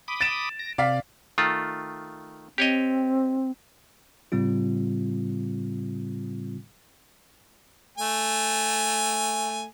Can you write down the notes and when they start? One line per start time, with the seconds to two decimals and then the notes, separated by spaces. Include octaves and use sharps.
0.08 B5 D6 D#6
0.21 A6 D7 E7
0.59 A#6
0.78 C3 D5 F5 B6
1.38 D#3 A3 F4
2.58 C4 G4 C#5 D#5
4.32 A2 C#3 G3 C4 F4
7.97 A3 G#5